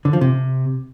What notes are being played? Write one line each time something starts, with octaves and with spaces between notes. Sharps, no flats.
D3
F3
C3